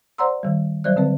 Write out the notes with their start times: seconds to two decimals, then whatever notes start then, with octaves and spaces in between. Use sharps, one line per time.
0.18 C5 D5 F#5 A#5 C6 E6
0.43 D#3 G3
0.84 F#3 G3 C5 D5 F#6
0.96 D3 C4 B4